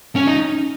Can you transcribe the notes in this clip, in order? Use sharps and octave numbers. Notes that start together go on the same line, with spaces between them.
C#4
D#4